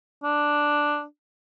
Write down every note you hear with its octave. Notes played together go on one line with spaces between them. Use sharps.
D4